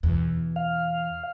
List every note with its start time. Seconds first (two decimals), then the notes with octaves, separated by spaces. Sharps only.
0.03 E2 B2
0.56 F5